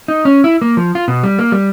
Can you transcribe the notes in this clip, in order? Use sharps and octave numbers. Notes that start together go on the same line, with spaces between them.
D#4
C#4
E4
A#3
F3
F4
B2
G3
A#3
G3